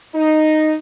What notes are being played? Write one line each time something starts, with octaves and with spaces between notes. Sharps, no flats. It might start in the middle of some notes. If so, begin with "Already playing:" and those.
D#4